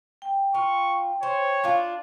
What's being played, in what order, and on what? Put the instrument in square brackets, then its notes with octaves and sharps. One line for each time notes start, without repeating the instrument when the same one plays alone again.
[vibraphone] G5
[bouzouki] F4 [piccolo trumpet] C#6
[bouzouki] C5 [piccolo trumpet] C#5
[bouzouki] D4 F4